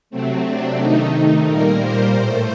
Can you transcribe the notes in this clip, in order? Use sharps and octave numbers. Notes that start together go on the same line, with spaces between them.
C3 F#3 A3 C4
D4
C3 D#3 A3 D#4
D#4
A#2 G3 A#3 A#4
C5
A2 A3 C5